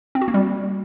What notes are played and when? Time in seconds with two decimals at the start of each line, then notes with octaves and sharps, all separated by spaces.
0.15 C4
0.21 F#4
0.28 A#3
0.34 G3